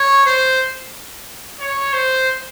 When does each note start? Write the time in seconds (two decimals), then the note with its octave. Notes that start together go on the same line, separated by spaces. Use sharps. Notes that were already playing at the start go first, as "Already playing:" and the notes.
Already playing: C#5
0.26 C5
1.60 C#5
1.93 C5